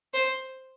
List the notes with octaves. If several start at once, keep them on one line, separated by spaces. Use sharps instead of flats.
C5